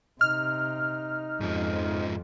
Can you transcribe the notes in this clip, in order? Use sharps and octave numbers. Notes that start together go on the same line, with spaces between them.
C3 D#4 F6
F2 G#2 F3